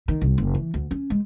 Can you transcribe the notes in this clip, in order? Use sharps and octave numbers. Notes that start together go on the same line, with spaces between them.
D#3
C2
F#1
E3
D2
C#4
G#3